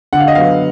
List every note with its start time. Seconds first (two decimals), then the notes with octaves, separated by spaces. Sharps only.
0.13 D3 F#5
0.20 F5
0.28 D#5
0.35 F#3 B3 F5